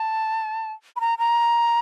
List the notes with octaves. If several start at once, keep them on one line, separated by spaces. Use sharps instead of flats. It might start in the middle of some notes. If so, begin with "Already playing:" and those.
Already playing: A5
B5
A#5
A#5